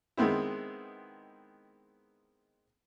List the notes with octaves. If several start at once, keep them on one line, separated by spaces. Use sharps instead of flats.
D#3 G#3 B3 C4 E4